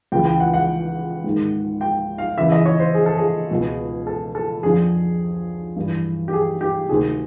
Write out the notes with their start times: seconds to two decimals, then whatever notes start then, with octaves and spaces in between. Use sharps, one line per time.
0.12 C#2 C#3 E3 G5
0.25 G5
0.40 F#5
0.54 F#5
1.24 G#2 D#3
1.81 G5
2.18 F5
2.38 E2 C#3 E3 E5
2.52 D#5
2.66 C#5
2.80 C5
2.94 G#4
3.06 A4
3.18 G#4
3.51 C#2 B2
4.07 A4
4.35 A4
4.63 F2 D3 F3 G#4
5.76 G2 E3
6.28 G4
6.33 G#4
6.61 G4
6.89 D2 C3 D#3 G#4